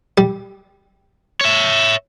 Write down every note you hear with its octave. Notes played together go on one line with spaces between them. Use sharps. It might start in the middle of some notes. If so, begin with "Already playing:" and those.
G3
C#5 E5